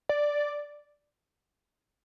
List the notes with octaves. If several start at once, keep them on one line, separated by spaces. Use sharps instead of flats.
D5